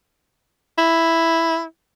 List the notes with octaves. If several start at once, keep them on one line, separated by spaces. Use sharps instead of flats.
E4